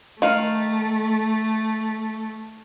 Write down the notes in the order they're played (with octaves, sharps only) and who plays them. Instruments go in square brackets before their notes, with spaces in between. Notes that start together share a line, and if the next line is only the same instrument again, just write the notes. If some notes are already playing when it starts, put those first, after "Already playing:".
[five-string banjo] D#3 F5 [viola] A3